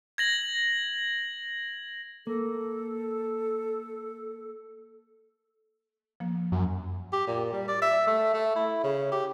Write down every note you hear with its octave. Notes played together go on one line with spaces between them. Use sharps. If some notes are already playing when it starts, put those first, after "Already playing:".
G#6 A#6 F#7
A#3 A4
F3 A#3
F#2
G4
A#2
G3
D5
E5
A3
A3
E4
C#3
G4